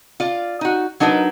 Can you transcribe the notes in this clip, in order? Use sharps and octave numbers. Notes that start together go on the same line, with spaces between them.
F4 D5
D#4 F#4
F#3 D4 D#4 A#4 B4